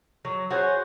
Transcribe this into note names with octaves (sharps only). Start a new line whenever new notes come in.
F#3
F#4 G#4 C5 C#5